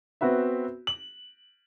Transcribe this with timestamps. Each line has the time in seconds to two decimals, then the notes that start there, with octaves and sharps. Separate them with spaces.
0.21 B3 C4 F#4 B4 E5
0.87 F#7